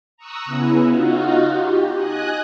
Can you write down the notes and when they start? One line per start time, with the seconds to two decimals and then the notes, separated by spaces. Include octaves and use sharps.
0.17 A#5 C#6 D#6 E6 F#6
0.45 C#3 B3 C#4 E4
0.85 D#4 F4 F#4
1.48 G4
1.95 D#5 G#5 D#6 F#6